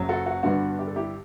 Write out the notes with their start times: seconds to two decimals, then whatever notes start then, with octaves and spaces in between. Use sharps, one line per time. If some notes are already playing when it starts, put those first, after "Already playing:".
Already playing: F#1 F#2 F#3
0.09 F#4 A4
0.26 F#4
0.43 G2 D3 G3 B3 D4 F#4
0.79 G4
0.87 A4
0.96 E4 G4